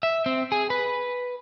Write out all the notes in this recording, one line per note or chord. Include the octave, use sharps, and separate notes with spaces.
E5
C4
G#4
B4